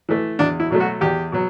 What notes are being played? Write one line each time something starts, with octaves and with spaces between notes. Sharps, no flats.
E3 A3
E2 D4
E4
B2 F#3 A3
F#4
E2 G4
B2 F#3